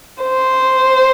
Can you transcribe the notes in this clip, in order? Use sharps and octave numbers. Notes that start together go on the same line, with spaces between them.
C5